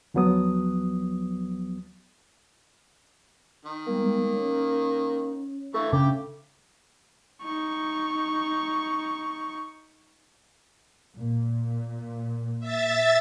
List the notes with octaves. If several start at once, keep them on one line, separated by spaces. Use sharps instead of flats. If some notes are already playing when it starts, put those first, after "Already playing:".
D2 F3 F#3 B3 D#6
D#3
G3 G#3 A#3 B3
C#4 C#5
E3 A3 D4 F5 C#6
C#3 A3 G5 D6
D#4 C#6
A#2
E5 A6